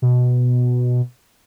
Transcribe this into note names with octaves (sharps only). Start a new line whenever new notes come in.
B2